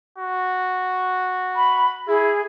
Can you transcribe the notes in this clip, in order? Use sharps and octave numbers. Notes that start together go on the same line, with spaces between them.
F#4
B5
E4 G#4